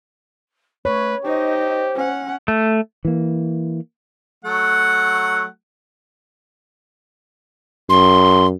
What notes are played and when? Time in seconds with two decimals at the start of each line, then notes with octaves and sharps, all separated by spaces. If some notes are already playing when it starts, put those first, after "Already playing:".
0.85 A3 B4 C#5
1.24 D#4 G4 C5 D#5
1.95 C#4 F#5
2.48 A3
3.05 E3 A#3
4.44 F#3 A3 F#5
7.90 F#2 C6